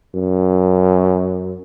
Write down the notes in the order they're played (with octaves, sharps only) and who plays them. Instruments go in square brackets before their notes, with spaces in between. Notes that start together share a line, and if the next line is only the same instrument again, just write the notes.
[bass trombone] F#2